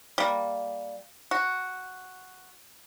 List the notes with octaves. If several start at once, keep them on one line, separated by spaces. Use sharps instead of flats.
G3 A#3
F#4